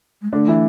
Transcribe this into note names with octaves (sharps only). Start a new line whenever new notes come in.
G#3
D3 A3 D4
E3 E4